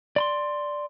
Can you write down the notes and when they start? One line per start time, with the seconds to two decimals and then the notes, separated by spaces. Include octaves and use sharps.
0.16 D5 B5 C6